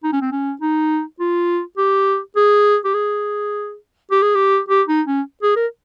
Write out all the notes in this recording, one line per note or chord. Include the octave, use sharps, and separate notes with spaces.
D#4
C#4
C4
C#4
D#4
F4
G4
G#4
G4
G#4
G4
G#4
G4
G4
D#4
C#4
G#4
A#4